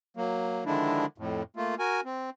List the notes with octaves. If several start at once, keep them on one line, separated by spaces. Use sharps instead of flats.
F#3 A#3
D3 D#3 F3 G#3 D4 E4
F2 A2
A3 A#3 F4
F#4 A#4 G#5
C4